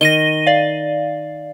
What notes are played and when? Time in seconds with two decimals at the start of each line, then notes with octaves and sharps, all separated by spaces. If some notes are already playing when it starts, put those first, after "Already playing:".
0.01 D#3 A#6 D#7 G7
0.46 D5 F5